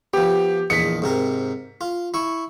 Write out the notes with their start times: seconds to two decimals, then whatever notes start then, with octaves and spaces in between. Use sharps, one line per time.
0.14 F3 B3 G4
0.70 A#1 E2 D#5 B6 C#7
1.02 G#2 C3 A#4
1.81 F4
2.14 E4 C#6